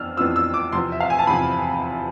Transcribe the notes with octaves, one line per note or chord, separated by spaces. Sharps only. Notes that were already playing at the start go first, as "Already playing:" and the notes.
Already playing: F2 E3 B3 D4 E6 F6
F2 E3 B3 D4 F4 E6
E6
D6
E2 C3 F3 C6
E5
F5
G#5
A5
E2 C3 F3 B5